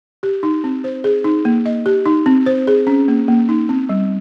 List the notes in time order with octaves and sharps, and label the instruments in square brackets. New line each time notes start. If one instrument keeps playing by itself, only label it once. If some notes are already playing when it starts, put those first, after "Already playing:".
[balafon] G4
D#4
C4
C5
G#4
D#4
A#3
D#5
G4
D#4
C4
C5
G#4
C#4
A#3
A#3
D#4
C4
G3